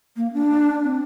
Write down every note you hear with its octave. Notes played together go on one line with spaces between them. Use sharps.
A#3
D4
C4